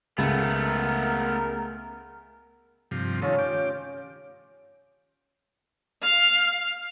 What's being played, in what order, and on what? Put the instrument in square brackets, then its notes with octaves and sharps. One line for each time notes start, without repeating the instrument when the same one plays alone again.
[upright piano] C#2 [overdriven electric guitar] A3 B3 [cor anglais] A#4
[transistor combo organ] G2 C3 F3
[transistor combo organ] D#3 A3 [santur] C#4 F4 C#5
[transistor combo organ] G4 D6
[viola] F5